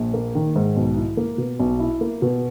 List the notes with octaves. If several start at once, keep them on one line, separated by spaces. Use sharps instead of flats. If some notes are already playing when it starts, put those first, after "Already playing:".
Already playing: A#1
A#3
D#3
G#2
B1
E4
A#3
B2
B1
E4
A#3
B2